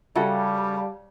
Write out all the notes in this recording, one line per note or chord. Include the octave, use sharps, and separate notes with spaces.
C#3 G3 F#4 A4 E5 F5 A5